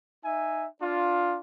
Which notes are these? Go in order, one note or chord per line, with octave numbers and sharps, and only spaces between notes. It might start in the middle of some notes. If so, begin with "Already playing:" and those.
D#4 E5 G#5
D4 F4